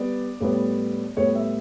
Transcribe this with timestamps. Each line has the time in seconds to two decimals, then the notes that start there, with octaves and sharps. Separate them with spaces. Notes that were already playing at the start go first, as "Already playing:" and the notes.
Already playing: G3 B3 D5
0.41 A2 G3 B3
1.16 A2 G3 B3 C#5
1.35 E5